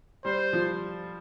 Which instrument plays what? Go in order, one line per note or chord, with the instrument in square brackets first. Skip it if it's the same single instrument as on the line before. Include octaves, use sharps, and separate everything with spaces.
[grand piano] G3 [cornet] C5
[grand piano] F3